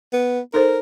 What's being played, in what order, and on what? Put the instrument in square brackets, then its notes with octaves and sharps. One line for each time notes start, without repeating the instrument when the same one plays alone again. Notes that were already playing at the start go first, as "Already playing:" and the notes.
[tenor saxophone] B3
[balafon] D#4 A4 C5 [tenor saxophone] A#4